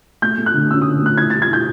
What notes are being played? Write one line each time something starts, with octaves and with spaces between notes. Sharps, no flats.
A3 G6
A3
F#6
D3
C#4 E6
D#6
D3
A3 F#6
E4 G#6
G3 A6
G#6
E4 G6